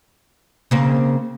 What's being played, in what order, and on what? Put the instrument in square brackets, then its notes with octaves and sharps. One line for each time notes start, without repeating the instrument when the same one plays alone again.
[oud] C#3 A#3 C4